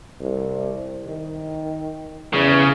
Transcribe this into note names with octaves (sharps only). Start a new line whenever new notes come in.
C2
D#3
E2 C#3